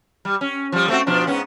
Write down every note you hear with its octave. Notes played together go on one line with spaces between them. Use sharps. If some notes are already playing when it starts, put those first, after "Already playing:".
G3
C#4
F3 G3
A3 C4 F#4
B2 F3 D4
G#2 B3 C#4